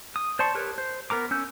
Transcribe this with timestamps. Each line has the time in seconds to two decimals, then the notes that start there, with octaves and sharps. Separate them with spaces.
0.16 D#6
0.39 C5 D5 A5 C6 C#6
0.55 G4 A#4 B4 C#5
0.78 C5
1.10 B3 A#4 A#5 D6
1.31 C#4 E6 G6